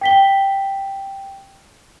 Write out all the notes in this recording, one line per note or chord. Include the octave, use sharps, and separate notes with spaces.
G5 B6 G7